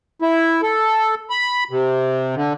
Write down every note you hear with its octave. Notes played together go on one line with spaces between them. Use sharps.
E4
A4
B5
C3
D3